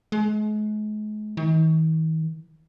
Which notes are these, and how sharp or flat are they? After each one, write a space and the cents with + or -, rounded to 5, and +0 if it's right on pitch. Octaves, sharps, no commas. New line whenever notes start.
G#3 +40
D#3 +45